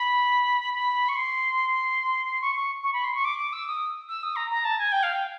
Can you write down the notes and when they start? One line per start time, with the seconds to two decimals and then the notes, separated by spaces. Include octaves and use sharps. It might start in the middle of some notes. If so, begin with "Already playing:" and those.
Already playing: B5
0.74 B5
1.09 C#6
1.16 C6
2.41 C#6
2.56 C#6
2.83 C#6
2.93 B5
3.04 C6
3.15 C#6
3.25 D6
3.39 D6
3.53 E6
3.67 D#6
4.09 E6
4.23 D#6
4.36 A#5
4.51 A#5
4.65 A5
4.79 G#5
4.92 G5
5.03 F5
5.13 G5